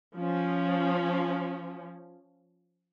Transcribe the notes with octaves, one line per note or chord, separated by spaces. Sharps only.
F3 C#4